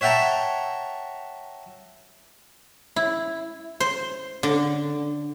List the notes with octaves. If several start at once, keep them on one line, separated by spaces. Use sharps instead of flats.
C#5 E5 F#5 G5 A5 A#5
E4
C5
D3